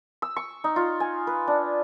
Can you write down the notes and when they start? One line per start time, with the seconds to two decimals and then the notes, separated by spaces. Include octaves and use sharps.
0.22 E6
0.36 C#6
0.64 D#4
0.76 F4
1.00 G#5
1.27 B4
1.48 D4